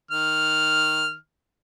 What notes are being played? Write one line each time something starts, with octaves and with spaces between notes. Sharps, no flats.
D#3 F6